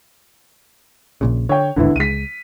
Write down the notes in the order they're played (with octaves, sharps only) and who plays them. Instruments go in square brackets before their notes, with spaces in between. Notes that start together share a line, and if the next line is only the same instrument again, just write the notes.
[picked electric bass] A#1 A#2 C#3
[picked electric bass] D3 [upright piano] C#5 G5
[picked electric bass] A1 D#2 G#2 [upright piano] D3 B3 E4
[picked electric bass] C#2 G#3 [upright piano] B6 D#7